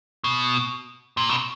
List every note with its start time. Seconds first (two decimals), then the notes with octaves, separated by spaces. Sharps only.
0.24 B2
1.17 A#2
1.29 B2